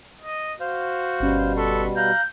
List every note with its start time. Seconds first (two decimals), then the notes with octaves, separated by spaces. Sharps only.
0.22 D#5
0.60 F#4 C5 F5
1.20 G1 B2 G3 C#4
1.57 A4 B4 C6 C#6
1.97 F5 A#5 F#6 G6